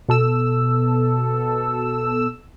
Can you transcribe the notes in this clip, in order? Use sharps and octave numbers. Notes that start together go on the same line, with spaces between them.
B2 A4 E6